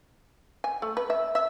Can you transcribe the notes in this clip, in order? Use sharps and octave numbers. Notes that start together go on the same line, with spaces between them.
G#5
A3
B4
E5
E5